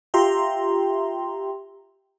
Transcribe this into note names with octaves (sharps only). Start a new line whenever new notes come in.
F4 G4 E5 G5 A#5 C6